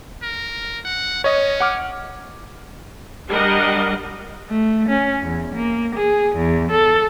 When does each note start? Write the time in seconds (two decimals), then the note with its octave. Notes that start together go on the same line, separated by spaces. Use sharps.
0.23 A#4
0.85 F#5
1.24 C#4 C#5 D#5
1.60 F#5 D6 F6
3.28 G3 D4 A#4 D#5 F#5
4.50 A3
4.88 C#4
5.23 E2
5.55 A#3
5.95 G#4
6.35 E2
6.71 A4